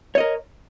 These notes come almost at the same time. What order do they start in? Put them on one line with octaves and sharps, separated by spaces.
C#5 D#5 A#4